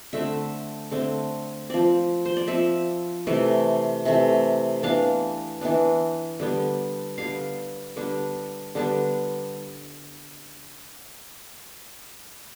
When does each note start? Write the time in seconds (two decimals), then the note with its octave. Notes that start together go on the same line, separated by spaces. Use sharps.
0.13 D3 A3 C4 E5
0.91 D3 A3 C4
1.70 F3 C4 D5
2.25 C5
2.37 D5
2.48 F3 C4 E5
3.27 C3 E3 A3
4.05 C3 E3 A3
4.83 E3 B3 D4 F5
5.61 E3 B3 D4
6.40 D3 G3 B3
7.18 D3 G3 B3 F5
7.96 D3 G3 B3 D4
8.75 D3 G3 B3 D4